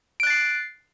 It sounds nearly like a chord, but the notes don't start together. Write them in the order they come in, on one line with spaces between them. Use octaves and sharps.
D7 F#6 A6 C7